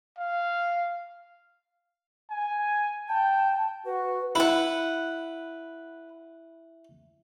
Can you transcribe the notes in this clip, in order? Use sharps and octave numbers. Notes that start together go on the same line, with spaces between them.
F5
G#5
G5 A5
F#4 B4
E4 B4 F#5